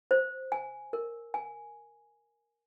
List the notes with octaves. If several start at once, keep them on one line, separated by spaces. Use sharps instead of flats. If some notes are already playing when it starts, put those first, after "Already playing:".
C5
G#5
A#4
G#5